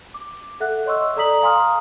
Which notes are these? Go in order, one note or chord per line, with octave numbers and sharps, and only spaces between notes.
D6
A4 E5 F#5 F#6
C#5 D#5 C6 C#6 E6
A4 D5 A#5 D#6 B6 F#7
F5 G#5 A#5 C6 D#6 F6